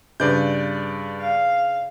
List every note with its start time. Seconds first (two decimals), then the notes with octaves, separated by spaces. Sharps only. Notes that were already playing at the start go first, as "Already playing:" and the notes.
0.20 G2 C#3 D4 B4 D5 G6
1.20 F5